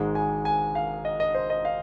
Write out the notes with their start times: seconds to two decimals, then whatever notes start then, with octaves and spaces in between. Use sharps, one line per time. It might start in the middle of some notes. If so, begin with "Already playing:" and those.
Already playing: G#1 G#2 G#3
0.15 G#5
0.45 G#5
0.75 F5
1.05 D#5
1.20 D#5
1.35 C5
1.50 D#5
1.65 F5